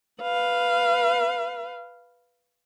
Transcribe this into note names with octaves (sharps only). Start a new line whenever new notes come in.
B4 F5